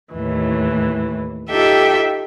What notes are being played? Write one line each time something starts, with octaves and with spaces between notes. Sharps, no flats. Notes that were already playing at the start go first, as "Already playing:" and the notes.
D#2 A2 E3
D#4 F4 G4 A4 E5 G5